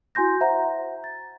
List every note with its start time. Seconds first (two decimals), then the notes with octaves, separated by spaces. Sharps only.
0.15 E4 F#4 G#5 C6 G6 A#6
0.41 C5 E5 F#5 A#5
1.04 A6